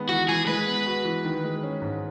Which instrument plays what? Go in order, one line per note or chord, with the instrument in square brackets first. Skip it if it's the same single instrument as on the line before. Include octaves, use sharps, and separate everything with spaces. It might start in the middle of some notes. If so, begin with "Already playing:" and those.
Already playing: [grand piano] D#3 G#3 B3
[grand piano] E3 [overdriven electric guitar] F#4
[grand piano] E3 [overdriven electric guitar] G#4
[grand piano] G#3 [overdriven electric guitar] B4
[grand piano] B3
F#4
E3
D#3
G#3
C#4
G#2